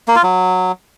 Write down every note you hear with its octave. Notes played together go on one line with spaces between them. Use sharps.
A#3
F4
F#3